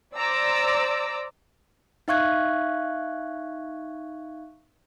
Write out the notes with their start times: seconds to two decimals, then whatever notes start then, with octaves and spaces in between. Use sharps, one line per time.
0.15 C5 D5 A#5 D6 E6
2.08 D#4 E5 F5 C#6 F#6 G#6